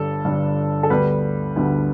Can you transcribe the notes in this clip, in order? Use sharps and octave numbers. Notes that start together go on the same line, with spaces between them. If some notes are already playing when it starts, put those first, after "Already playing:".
Already playing: G1 G2 G3 D4 A4
G1 G2 G3 D4
A4
D2 D3 G3 B3 B4
D2 D3 G3 B3